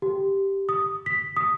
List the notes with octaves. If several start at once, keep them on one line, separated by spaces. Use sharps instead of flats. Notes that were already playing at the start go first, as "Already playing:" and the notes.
G4
D#6
B6
D#6